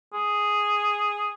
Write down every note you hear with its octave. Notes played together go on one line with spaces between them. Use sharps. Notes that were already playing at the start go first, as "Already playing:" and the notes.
G#4